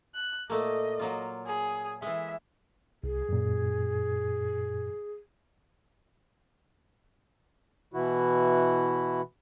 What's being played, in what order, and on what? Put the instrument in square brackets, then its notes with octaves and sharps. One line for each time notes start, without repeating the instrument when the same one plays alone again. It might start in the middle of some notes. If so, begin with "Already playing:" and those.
[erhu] F#6
[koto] A#2 A3 A#3 [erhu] D#5
[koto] F#3 A#3 F4
[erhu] G#4
[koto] E3 G#3 [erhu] E5
[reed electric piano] C2 [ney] G#4
[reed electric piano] F#2 A#2
[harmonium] B2 E3 E4 F#4